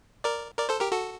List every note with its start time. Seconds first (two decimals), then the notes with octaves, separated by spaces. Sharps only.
0.24 A#4 D5
0.58 A#4 D5
0.69 A4 C5
0.80 G4 A#4
0.91 F#4 A4